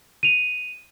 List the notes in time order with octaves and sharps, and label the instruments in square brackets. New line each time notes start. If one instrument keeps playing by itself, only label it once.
[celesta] D#7 F7